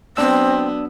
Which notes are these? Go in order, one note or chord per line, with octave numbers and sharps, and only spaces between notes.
F#3 B3 C4 D4 E6